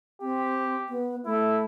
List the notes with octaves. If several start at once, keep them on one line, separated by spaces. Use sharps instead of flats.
C4 G4
B3
A3 E4